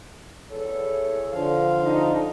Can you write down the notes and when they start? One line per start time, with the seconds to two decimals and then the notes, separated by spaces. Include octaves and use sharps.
0.51 E2 A4 C#5
1.32 D3 F3 F5
1.83 D4 D#4